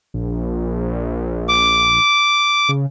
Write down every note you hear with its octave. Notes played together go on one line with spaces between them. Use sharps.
A#1
D6
C#3